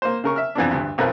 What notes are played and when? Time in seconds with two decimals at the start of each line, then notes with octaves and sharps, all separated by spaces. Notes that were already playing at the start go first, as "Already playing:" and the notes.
0.02 A#3 C5
0.24 C#3 A#4 C#6
0.36 E5 F6
0.55 F2 E3 B3 D4
0.71 D2 G2
0.98 B1 F2 F3 A#4 B4